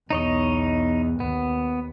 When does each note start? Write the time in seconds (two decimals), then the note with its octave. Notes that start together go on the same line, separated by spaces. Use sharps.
0.10 B1 E2 D#4 C#5 D#5
1.20 D#2 B3